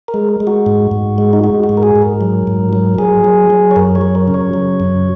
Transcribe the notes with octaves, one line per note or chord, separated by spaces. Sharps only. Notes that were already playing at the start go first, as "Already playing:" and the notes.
A#4
G#3
G#3
F#4
G#2
G#2
G#3
D#4
G#3 F#4
F#4
G#2
A#4
G#4
G#2
A#4
F#3
G#2
F#3
F#3 G#4
F#3
F#3
C#5
F#2 A#4
C#5
F#3
A#4
C#3
C#5
F#3
F#2